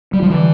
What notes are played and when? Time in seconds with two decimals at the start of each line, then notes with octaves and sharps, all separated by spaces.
0.13 G3
0.22 F3
0.30 D3 E3 G3 B3